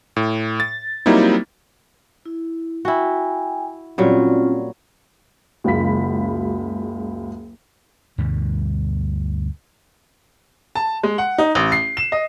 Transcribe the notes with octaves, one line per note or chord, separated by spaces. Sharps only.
A2
A6
F#3 G3 A#3 C4 D#4 E4
E4
E4 F#4 G5 G#5
A#2 F#3 G3 C4 C#4 F4
F#1 C#2 F#4 F5 B5 B6
D2 G2 B2 G3
A5
G#3
F#5
D#4
A1
C7
E7
D#5